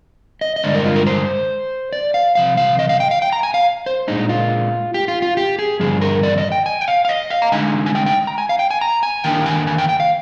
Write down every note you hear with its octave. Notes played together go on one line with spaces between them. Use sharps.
D#5
D#5
G2 D3 G#3 D4 D5
A#4
F4
A#4
C5
D5
F5
C3 F3 F5
F5
D#5
F5
G5
F5
G5
A#5
G#5
F5
C5
A#2 G#3 D4 D#4
F4
G4
F4
F4
G4
G#4
G2 D3 F3 G#4
A#4
D5
D#5
G5
G#5
G5
F5
F5
D#5
F5
A#5
D3 G#3 D#4 G#5
G#5
G5
G5
A#5
G#5
F5
G5
G#5
A#5
G#5
D#3 A#3 D4 G5
G#5
G#5
G5
G5
F5